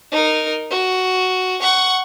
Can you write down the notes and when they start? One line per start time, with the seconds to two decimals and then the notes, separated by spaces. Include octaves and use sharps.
0.12 D#4 A#4
0.71 F#4
1.62 F#5 C#6